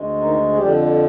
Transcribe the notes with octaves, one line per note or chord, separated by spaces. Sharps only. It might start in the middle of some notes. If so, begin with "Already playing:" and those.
Already playing: D2 G#3
D#3 D#4
G#4
F2 D3 F3 G3 G4